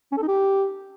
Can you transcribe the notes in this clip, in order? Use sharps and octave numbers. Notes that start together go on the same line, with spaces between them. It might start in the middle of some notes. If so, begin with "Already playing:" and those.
C#4
A4
D#4
G4